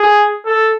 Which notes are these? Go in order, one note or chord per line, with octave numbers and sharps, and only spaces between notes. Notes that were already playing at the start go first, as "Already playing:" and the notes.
Already playing: G#4
A4